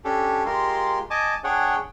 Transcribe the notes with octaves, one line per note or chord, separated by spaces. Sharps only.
C#4 D4 G4 A4
G#3 F4 G4 A#4 C6
D#5 G#5 A5 D6
D4 G#4 C#5 F#5 G5